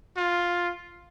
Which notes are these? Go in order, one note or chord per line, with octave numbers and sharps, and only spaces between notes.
F4